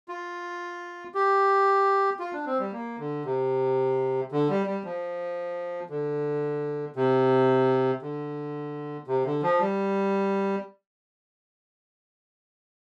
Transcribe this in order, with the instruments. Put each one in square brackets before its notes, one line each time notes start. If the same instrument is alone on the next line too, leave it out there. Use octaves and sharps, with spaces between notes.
[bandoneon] F4
G4
F4
D4
C4
G3
A#3
D3
C3
D3
G3
G3
F3
D3
C3
D3
C3
D3
F3
G3